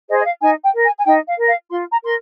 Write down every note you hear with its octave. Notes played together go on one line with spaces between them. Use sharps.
G#4 C5 D#5
D#5
F5
D#4 G#5
G5
A#4
G#5
G#5
D#4 G5
F5
A#4
F5
F4 C6
A#5
A#4 C6